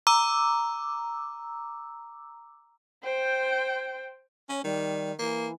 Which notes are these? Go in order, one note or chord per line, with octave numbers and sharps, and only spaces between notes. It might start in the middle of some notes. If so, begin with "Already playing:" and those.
A#5 D6 E6
C5 G5
C#4 C#5
D#3 G3
E3 A#3